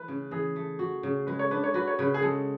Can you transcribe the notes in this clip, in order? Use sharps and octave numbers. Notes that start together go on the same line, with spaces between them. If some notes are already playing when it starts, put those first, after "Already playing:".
Already playing: E3 A3 B4
C#3
E3 G#4
A3
F#4
C#3
G#3 B4
C#5
D4 B4
C#5
F#4 B4
C#5
C#3 B4
G#4
G#3 A4